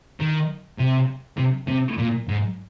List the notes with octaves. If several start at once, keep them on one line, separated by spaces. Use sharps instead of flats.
D#3
C3
C3
C3
A#2
G#2